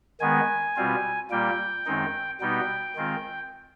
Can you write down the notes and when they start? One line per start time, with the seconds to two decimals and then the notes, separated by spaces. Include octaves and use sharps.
0.20 D#3 G#3 B3 G#5
0.76 B2 G3 C4 F4
1.31 A#2 G3 A#3 G5
1.85 F#2 D#3 G#3 C4 D#4
2.41 B2 G3 B3 D#4 G5
2.96 D#3 G#3 C4 F4